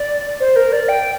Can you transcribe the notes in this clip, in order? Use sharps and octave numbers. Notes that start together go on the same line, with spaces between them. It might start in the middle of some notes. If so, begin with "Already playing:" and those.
Already playing: D5
C5
A#4
D5
G5